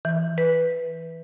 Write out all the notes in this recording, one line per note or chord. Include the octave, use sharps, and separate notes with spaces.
E3
B4